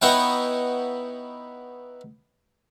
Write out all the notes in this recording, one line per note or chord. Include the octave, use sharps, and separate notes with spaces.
B3 D#4 E4 C#5 F#5 G5